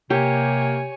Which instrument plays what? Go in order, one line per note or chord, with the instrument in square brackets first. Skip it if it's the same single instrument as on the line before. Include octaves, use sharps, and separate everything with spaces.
[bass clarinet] C3 [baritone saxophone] A#3 [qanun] G4 [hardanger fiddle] C#5 G#5